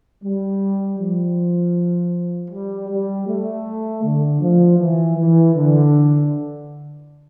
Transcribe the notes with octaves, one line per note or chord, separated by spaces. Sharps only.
G3
F3
G3
G3
A3
D3
F3
E3
E3
D3